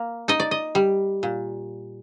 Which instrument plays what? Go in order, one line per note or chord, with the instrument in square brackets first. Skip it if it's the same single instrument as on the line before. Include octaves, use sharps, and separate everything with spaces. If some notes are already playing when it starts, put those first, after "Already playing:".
Already playing: [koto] A#3
D#4 D#5
D5
D#5
G3
A#2